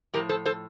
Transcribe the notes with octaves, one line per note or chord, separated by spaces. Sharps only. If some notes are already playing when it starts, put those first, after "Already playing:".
A2 F3 G4 A#4
A4 C5
A4 C5